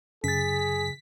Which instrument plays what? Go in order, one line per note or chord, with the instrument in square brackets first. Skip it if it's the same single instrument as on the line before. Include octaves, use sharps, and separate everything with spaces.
[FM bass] F#2 [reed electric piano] C#3 A6 [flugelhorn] G#4 [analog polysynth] B6